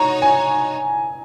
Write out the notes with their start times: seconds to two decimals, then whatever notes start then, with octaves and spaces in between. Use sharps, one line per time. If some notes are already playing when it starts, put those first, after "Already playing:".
Already playing: D#4 F#4 C#5 A#5
0.22 G#5